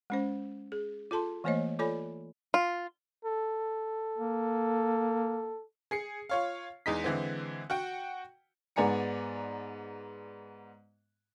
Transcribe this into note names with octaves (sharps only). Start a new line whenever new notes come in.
G#3 C#4 C5
G#4
F4 A4 A5 C6
E3 A3 A#3 C5 C#5 D#5
F4 A4 C#5 D5 G#5 B5
F4
A4
A#3
G#4 C7 C#7
F4 C#5 F5
E2 G#3 D#4 B6
D3 E3 G#3 C4
F#4 F#5 G5
G#2 B3 D5 G#5 A#5 C#7